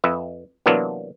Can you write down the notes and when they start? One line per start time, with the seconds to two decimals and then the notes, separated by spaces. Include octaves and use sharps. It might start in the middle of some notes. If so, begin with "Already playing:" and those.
0.04 F2 B4 E5
0.66 C3 E3 F#3 A#3 B3 D4